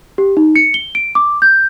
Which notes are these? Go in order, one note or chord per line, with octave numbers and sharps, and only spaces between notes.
G4
D#4
C#7
G7
D7
D6
G6